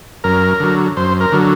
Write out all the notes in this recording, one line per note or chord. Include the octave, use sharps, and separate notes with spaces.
F#2 A#4
D3 F#3
F#2 C5
A#4
D3 F#3